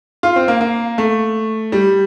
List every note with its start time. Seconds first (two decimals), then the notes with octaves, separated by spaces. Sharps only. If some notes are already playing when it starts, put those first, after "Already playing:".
0.23 F4
0.36 C4
0.48 A#3
0.61 A#3
0.98 A3
1.72 G3